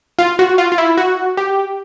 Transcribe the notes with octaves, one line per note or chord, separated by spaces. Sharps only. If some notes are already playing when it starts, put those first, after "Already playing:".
F4
F#4
F4
F4
E4
F#4
G4